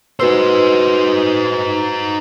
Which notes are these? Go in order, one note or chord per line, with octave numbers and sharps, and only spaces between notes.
D#4 F#4 B4 C5 E6